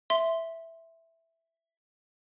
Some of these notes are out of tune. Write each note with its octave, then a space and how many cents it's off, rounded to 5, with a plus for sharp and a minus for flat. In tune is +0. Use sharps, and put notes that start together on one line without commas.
E5 +0 C6 +0